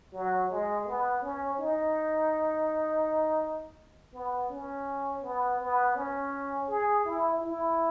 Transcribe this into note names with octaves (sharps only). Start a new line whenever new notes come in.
F#3
G#3
B3
C#4
D#4
B3
C#4
B3
B3
C#4
G#4
E4
E4